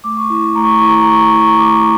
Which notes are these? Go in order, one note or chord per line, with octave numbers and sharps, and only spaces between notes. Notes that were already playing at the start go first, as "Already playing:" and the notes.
A3 D6
C#6
E4 C#6
A3 A#5
C#6
A#5
E4 C#6
A#5
C#6
A#5
A3 C#6
A#5
C#6
E4 A#5
C#6
A#5
A3 D6
E4